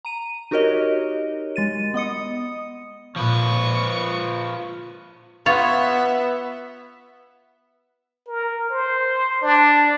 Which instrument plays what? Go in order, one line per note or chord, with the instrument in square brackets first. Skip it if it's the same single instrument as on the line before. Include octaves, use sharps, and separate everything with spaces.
[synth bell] A#5 D#7
D#4 F#4 G4 A#4 C#5 D#5
G#3 A6 D#7
B3 D#5 D#6 C#7
[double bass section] A#2 [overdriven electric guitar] F3 B4 [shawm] C#6
[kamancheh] B3 E5 [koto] F4 C#5
[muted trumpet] A#4
C5
D4